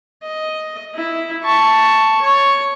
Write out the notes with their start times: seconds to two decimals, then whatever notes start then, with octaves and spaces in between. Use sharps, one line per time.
0.23 D#5
0.95 E4
1.43 A5 C#6
2.22 C#5